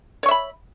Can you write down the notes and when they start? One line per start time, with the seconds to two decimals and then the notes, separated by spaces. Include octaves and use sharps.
0.23 C#5
0.26 C#6
0.29 E5
0.31 B5